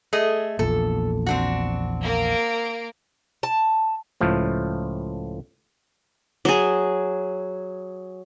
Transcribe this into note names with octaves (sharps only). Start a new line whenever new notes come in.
A3 G#4 D#5
A#1 E2 A#2 A4
C4 D4 F#4
A#3 D7
A5
C#2 A2 F3 A3
F#3 G#4